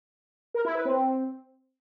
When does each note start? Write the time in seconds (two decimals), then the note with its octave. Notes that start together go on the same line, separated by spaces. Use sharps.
0.54 A#4
0.65 E4
0.75 B4
0.85 C4